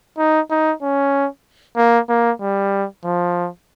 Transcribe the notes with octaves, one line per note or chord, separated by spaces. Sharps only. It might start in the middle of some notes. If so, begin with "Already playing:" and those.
D#4
D#4
C#4
A#3
A#3
G3
F3